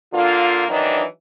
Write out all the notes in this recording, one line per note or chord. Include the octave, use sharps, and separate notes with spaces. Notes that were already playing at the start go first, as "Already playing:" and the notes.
D3 A#3 F4
D#3 E3 F#3 D4 D#4